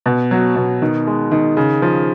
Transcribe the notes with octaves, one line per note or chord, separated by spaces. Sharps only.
B2
F#3
B2
D#3
G#3
D#3
C#3
F3